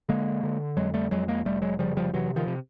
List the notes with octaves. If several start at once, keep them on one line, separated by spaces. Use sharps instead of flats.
D3 G#3 A#3
D3
F2 F#3 G#3
G3 A3
F2 F#3 G#3
G#3 A#3
F1 G3 A3
F#3 G#3
C#3 F3 G3
F3 G3
C3 E3 F#3
D#3 F3
C3